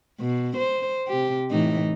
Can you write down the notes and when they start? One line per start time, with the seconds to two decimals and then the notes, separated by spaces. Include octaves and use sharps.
0.20 B2
0.57 C5
1.08 C3 G4
1.51 A2 E3 D#4